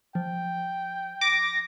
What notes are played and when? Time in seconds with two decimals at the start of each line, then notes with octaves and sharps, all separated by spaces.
0.15 F3 G5
1.21 D6 A#6